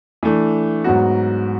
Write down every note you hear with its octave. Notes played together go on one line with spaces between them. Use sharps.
E3 A3 D4
G#2 F#3 B3 F#4